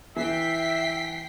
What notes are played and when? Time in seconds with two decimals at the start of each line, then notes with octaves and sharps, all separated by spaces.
0.16 E3 E5 G5 B6 C7